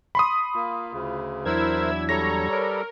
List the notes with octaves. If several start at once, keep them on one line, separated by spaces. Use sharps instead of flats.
B5 C6 D#6
A#3 F4
D2 C#3
E2 F#3 D4 E4 A#4 C5 E6 G#6
G3 A4 C#5 A#5 A#6
A#4 B4 D5